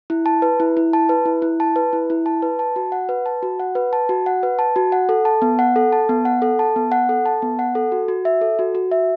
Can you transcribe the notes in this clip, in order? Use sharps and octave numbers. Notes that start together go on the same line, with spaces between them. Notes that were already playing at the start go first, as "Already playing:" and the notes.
E4
A5
B4
E4
E4
A5
B4
E4
E4
A5
B4
E4
E4
A5
B4
A5
F#4
F#5
B4
A5
F#4
F#5
B4
A5
F#4
F#5
B4
A5
F#4
F#5
A4
A5
B3
F#5
A4
A5
B3
F#5
A4
A5
B3
F#5
A4
A5
B3
F#5
A4
F#4
F#4
E5
A4
F#4
F#4
E5